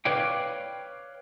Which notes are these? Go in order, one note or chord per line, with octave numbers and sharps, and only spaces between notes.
B4 C#5 D5 F5 G5